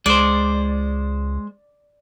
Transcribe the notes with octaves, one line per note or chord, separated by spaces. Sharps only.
C#2 G#3 C5 D5